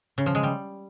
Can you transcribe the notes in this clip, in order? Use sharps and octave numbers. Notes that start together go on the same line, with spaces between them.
C#3
F3
G#3
G3